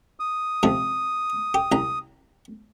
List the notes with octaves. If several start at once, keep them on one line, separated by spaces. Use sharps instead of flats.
D#6
G#2 C3 F3
G4
C2 A#5